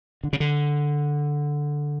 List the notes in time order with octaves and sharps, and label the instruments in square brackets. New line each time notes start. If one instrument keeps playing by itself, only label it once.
[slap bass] D3
C#3
D3